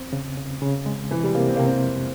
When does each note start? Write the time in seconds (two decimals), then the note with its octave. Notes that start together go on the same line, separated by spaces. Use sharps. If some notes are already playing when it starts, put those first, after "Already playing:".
Already playing: E2 C4
0.13 C#3
0.37 C#3
0.62 C#3
0.86 G#3
1.11 C3 E3
1.23 G3
1.35 C3 A#3
1.48 C4
1.56 C3 A#3
1.66 C4
1.84 F2